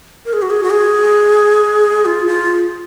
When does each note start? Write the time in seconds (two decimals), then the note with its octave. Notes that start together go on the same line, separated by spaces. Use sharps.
0.25 A#4
0.33 G#4
0.42 F#4
0.50 G#4
0.64 F#4
0.70 G#4
2.05 F4
2.27 F4